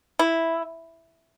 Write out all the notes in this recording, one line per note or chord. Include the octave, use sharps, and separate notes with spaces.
E4